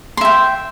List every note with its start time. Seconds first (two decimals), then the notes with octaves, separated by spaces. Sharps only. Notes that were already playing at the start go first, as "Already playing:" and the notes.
0.17 C6
0.21 E5
0.25 G5